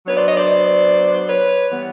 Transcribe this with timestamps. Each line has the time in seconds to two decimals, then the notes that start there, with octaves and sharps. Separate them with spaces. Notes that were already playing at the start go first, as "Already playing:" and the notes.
0.07 F#3 B3 D4 B4 C#5
0.17 C5 D5
0.27 C#5 D#5
0.37 C5 D5
1.29 B4 C#5
1.70 E3 G3 B3